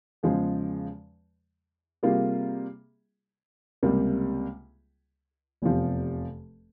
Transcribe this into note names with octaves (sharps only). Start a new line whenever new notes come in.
E2 C#3 F3 G#3
C3 G3 A#3 F4 G#4
C#2 C3 G3 A#3
F1 E2 C3 F3